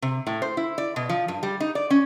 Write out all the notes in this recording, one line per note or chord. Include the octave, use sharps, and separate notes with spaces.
C3
A2
C5
E4
D5
B2
F3
G2
G3
D#4
D5
C#4